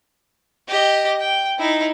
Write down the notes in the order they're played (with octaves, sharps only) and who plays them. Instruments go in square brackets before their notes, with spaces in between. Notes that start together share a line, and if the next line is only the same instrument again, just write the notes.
[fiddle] G4 D#5
G5
D#4 E4